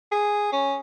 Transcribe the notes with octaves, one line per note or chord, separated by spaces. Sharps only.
G#4
C#4